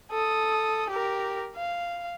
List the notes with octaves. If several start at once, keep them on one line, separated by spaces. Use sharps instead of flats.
A4 D#6
G4 A#4
F5